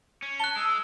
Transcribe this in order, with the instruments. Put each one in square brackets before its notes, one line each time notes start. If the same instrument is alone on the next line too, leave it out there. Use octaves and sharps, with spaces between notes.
[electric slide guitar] C#4
[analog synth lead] A5 [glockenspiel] F#6 G7
[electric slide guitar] G#3 [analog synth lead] E6